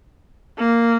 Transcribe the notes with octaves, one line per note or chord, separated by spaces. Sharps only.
A#3